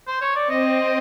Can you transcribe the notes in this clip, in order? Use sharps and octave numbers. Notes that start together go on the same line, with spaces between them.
C5
C#5
D5
C4 D#5